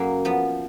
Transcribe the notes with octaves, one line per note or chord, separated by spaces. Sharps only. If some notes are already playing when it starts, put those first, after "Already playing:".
Already playing: F#2 A#3
F3 B3